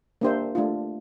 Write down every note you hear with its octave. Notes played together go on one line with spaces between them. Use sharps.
A#3 D4 G4 C5 E5
A3 D4 F4